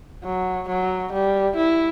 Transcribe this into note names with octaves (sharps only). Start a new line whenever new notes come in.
F#3
F#3
G3
E4